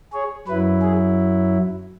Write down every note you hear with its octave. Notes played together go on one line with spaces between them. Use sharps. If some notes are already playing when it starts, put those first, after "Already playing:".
G#4 C#5
F#2 F#3 E4 B4
G#4